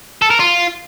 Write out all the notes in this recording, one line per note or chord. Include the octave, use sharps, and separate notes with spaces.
A4
A#4
F4